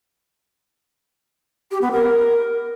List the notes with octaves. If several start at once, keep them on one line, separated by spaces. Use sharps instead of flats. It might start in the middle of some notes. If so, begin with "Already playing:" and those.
G4
B3
A#4